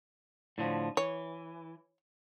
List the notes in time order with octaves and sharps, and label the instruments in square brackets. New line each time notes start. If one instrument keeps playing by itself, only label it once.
[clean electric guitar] A2 D3 F3
[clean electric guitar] E3 [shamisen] C#5